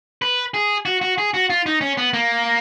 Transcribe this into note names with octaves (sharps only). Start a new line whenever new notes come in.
B4
G#4
F#4
F#4
G#4
F#4
F4
D#4
C#4
B3
A#3